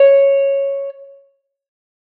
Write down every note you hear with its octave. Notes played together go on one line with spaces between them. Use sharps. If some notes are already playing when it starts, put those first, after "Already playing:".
Already playing: C#5